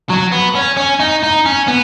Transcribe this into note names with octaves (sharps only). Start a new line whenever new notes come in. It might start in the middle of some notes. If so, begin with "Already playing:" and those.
F#3
B3
C#4
C#4
D#4
D#4
C#4
B3